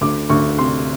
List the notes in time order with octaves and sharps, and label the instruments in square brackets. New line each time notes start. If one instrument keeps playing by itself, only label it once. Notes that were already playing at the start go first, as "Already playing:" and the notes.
[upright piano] D2 D6
D2 C#6
C3 C6